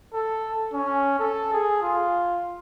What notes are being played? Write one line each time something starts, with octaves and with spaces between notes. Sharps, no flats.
A4
C#4
A4
G#4
F4